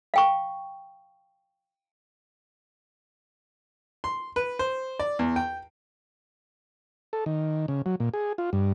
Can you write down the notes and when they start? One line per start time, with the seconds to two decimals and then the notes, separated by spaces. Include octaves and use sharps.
0.14 F5 G5 C#6
4.04 C6
4.36 B4
4.59 C5
4.99 D5
5.19 E2
5.36 G5
7.13 A4
7.26 D#3
7.68 C#3
7.86 F#3
8.00 A#2
8.14 G#4
8.38 F4
8.53 G2